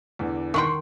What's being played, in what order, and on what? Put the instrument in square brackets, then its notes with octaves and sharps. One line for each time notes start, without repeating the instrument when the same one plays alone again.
[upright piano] E2 D3 E3
[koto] D#3 F#5 G5 [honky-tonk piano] C6 C#6